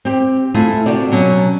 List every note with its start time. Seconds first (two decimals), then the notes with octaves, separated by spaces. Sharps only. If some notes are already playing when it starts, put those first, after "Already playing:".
0.05 C4 G4
0.54 A3 E4 F4 G#4
0.86 C3 F#4 G4 D5
1.12 B2 F#3 C#4